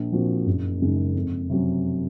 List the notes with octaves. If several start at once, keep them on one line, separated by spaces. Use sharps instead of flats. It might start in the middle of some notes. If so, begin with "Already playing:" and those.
Already playing: A#1
A#2 F3 C4 F#4
F#1
F#2 C#3 G#3 D#4
F2
C3 F#3 C#4